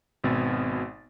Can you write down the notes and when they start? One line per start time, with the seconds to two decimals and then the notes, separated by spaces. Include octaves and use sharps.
0.24 G#1 B2 B3 C4 A6